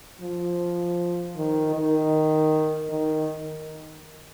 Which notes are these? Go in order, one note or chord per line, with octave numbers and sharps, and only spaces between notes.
F3
D#3
D#3
D#3